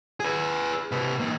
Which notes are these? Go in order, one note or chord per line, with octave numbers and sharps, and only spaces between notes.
G#4 B4
C3 B4
E3 A#3